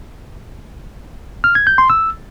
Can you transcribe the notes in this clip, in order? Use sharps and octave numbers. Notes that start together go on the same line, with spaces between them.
F6
G#6
G6
C6
E6